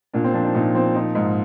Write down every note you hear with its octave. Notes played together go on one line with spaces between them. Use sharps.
A#2 D4
C4
F3 D4
D#4
A#2 D#4
F3 C4
F3 D#4
G#2